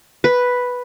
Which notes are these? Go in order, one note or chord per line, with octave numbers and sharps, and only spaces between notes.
B4